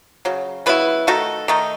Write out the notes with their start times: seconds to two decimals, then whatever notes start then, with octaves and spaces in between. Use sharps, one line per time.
0.25 C#3 F#3
0.66 C#3 F#3 B3 E4 B4
1.07 D#3 A3 D#4 F#4 A4
1.48 D#3 A3 D#4